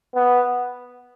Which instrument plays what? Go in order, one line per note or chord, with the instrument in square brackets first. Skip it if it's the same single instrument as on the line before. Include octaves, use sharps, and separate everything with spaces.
[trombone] B3